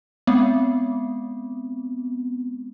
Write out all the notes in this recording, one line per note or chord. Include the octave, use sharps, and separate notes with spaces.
G#3 B3 C4